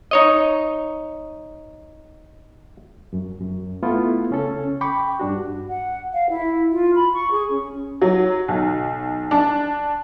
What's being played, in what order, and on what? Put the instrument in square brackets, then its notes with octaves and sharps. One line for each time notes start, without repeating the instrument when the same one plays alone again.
[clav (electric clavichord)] D#4 C#5 D#5
[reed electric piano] F#2
F#2
A3 B3 E4 F4 A4
C#3 C#4 A4
G5 B5 C#6 D6
G2 D4 F#4
[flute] F#5
F5
E4
F4
B5
C#6
G#4
C#4
[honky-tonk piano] F#3
B1
D4